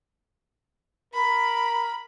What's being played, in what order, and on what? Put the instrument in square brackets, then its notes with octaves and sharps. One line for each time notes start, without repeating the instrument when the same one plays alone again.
[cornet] A#4 [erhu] B5